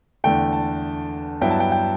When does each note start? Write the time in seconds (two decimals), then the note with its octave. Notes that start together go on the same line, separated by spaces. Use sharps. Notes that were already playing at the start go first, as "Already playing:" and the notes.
0.24 E2 D3 A3 G5
0.52 A5
1.41 G2 F#3 B3 E4 G5
1.51 A5
1.60 G5
1.72 G5